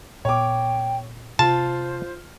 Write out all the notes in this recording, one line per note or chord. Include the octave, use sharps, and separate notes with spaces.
A#2 B3 C#5 G5 D6
C3 F4 C5 A5